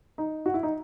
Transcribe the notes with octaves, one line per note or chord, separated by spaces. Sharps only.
D#4
F#4
E4
D#4